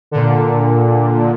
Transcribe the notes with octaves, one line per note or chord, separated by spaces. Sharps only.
A#2 D3